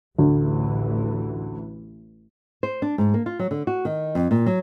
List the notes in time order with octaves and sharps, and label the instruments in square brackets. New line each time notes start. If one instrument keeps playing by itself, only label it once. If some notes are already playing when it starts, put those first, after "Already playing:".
[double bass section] A1 E3 [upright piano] D2
[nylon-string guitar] C5
D4
G#2
A#3
F4
F#3
D3
F#4
D#3
F2
A#2
F#3